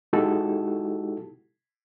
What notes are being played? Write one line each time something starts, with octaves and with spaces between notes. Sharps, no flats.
G#3 D#4 E4 F#4 G4 A4